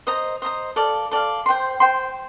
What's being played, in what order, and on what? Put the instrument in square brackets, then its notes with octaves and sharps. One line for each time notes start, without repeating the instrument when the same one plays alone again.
[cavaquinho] C5 D#5 A#5 D#6
C5 D#5 A#5 D#6
A4 D5 F5
A4 D5 F5
C5 G5 C6
C5 G5 C6